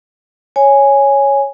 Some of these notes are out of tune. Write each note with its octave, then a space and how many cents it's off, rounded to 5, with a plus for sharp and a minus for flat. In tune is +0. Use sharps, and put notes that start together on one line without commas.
C#5 +0 G#5 +0